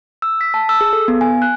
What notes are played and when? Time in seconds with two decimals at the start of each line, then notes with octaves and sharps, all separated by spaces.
0.22 E6
0.41 B6
0.54 A5
0.69 E6
0.81 G#4
0.93 A4
1.08 B3
1.21 G#5
1.42 F#6